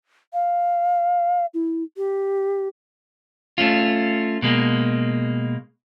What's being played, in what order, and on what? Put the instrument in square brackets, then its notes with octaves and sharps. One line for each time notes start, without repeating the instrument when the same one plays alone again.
[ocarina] F5
E4
G4
[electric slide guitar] A3 C#4 F4
B2 G#3 A#3